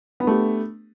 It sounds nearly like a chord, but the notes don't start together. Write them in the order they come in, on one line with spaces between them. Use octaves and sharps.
B3 D4 A3 G4